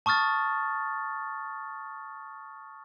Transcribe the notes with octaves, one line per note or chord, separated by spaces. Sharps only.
A5 C#6 D#6 F6 A6